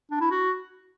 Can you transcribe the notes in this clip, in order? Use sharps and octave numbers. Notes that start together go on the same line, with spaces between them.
D4
E4
F#4